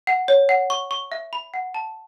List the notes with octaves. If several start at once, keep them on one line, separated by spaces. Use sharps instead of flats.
F#5
C#5
F#5
C#6
C#6
E5
B5
F#5
A5